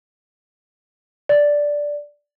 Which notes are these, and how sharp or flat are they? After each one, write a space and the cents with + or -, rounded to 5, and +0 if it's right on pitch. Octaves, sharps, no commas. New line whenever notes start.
D5 -5